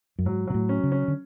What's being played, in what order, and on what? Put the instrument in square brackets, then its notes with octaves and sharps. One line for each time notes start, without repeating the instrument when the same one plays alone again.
[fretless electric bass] F#2
[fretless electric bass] G#2 [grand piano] F#3
[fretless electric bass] B2 [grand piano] F#3
[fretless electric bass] A2
[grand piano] C#4
[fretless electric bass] C#3
[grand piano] C#4
[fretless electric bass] D3